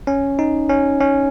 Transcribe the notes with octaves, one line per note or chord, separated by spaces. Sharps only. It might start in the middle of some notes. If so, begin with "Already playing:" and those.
C#4
D#4
C#4
C#4